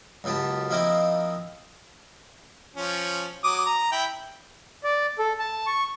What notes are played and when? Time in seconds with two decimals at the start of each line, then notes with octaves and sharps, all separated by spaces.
0.24 C#2 F#2 B3 G4 A5
0.70 F3 A#3 C4 D#4 E4 C5
2.76 F3 C#4
3.44 F#3 D6 D#6
3.66 A#5
3.92 E4 G5
4.84 D5
5.19 A4
5.39 A5
5.67 C#6